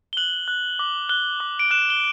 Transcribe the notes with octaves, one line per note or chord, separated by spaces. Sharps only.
G7
F#6 F#7
F#6
D6
F#6 G7
D6
D7
F#6 E7
G7